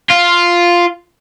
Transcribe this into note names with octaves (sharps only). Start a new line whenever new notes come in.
F4